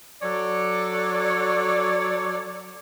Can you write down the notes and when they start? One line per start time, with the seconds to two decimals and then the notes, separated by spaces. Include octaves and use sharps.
0.22 F#3 A4 C#5 D5